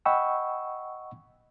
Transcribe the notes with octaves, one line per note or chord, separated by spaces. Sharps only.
D#5 F#5 G5 B5 C#6 E6